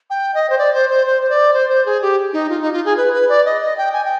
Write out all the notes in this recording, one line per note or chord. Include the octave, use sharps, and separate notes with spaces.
G5
D#5
C5
D5
C5
C5
C5
C5
D5
C5
C5
G#4
G4
D#4
F4
D#4
F4
G#4
B4
B4
D5
D#5
D#5
G5
G#5
G5